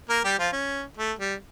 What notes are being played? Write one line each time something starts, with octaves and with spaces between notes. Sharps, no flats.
A#3 A#4
G3 G4
F3 F4
C#4
A3
G3